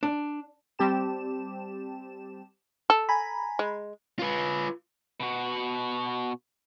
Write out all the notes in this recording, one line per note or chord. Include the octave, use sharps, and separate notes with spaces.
D4
G3 C4 G4 A5 E7
A4
G#5 A#5 B5
G#3
F4 B4
B2 F#4